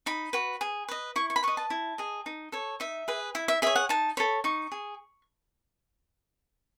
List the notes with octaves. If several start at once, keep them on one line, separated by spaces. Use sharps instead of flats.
D#4 B5
F#4 B4
G#4
B4 D#5
E4 C#6
C#6
B5
B4 D#5 C#6
A5
E4
G#4 D#5
D#4
A4 C#5
D#4 E5
G#4 B4
E4 E5
E5
G#4 C#5 E5
F#5
D#4 A5
A4 C#5 B5
D#4 C#6
G#4